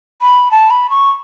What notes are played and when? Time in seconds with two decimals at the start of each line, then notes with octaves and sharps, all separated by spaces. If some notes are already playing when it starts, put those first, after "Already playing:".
0.21 B5
0.51 A5
0.70 B5
0.90 C#6